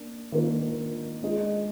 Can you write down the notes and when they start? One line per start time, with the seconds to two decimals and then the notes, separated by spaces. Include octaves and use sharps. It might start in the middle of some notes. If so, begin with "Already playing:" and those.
Already playing: A#3 D4
0.32 D#3 A#3 D4 F4 A#4
1.22 G#3 D4 F4 G#4 D#5